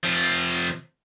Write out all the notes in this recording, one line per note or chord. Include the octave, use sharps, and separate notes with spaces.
C3 F3